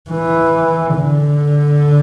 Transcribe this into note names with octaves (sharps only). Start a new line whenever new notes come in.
E3
D3